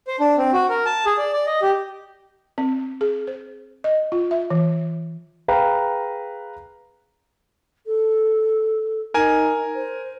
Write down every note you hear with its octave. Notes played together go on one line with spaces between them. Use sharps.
C5
D4
C4
F#4
A#4
A5
G#4
D5
D5
D#5
G4
C4
G#4
C5
D#5
F4
E5
E3
G#4 B4 F5 G5 A#5
A4
D#4 A#4 G#5
C5